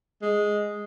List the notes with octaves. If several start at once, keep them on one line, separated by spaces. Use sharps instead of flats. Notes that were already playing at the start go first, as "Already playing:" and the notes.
G#3